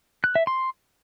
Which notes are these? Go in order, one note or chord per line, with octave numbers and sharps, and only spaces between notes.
F#6
E5
C6